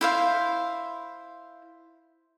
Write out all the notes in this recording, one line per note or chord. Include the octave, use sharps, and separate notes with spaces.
E4 C5 F5